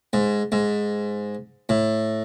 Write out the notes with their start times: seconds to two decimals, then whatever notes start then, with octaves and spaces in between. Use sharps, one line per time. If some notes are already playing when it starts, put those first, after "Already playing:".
0.13 G#2
0.52 G#2
1.69 A2